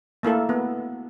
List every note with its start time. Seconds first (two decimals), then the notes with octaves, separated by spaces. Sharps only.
0.23 A3 A#3 E4 A4
0.49 B3